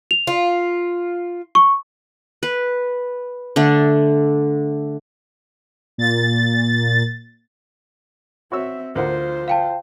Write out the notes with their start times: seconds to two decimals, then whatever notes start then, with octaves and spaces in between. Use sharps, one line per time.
0.11 F7
0.27 F4
1.55 C#6
2.43 B4
3.56 D3 A3 D4
5.98 A#2 A6
8.52 C4 F#4 C#5 E5 E6
8.95 D2 F4 A#4 C5 F#5
9.48 F5 G5 A5